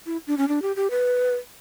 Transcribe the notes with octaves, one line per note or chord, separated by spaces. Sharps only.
E4
D4
C#4
D4
G4
G4
B4